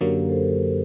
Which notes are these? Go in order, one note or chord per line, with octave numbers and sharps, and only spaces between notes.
F#2 D3 F#3 A#3 G4 A#4
A4 C5